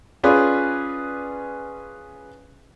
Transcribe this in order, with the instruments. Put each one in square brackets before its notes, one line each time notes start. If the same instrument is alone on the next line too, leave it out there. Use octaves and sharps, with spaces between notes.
[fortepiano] C#4 F4 G#4 B4 D5